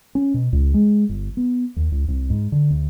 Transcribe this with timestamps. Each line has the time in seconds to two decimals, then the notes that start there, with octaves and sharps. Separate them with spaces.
0.15 C#4
0.34 B2
0.53 C#2
0.74 G#3
1.09 G1
1.37 B3
1.76 D#2
1.92 C#2
2.08 C2
2.30 G#2
2.52 D3
2.70 D2